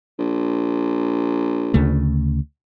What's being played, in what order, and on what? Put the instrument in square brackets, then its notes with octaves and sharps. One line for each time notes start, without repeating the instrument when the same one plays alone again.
[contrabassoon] A#1
[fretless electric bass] D2 C#3 A3